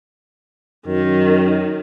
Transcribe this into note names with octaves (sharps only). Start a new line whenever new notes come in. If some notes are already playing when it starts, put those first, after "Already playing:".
F#2 D#3